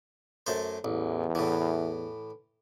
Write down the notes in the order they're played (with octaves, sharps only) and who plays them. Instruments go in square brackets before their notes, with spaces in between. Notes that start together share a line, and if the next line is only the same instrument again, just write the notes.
[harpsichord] F#2 A3 C5
[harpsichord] A1 [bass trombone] E2
[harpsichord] A2 E3